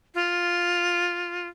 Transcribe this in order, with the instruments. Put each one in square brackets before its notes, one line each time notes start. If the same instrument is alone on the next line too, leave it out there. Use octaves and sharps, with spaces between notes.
[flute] F4